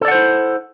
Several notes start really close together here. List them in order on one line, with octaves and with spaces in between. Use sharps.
A4 D5 F#5 C5 E4